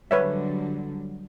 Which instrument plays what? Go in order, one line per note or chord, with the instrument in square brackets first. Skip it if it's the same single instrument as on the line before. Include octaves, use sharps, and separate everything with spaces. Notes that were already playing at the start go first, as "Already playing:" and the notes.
[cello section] D3 F#3 G3 [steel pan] B4 C#5 E5